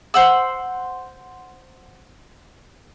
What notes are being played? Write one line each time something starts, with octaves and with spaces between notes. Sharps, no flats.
C5 F#5 E6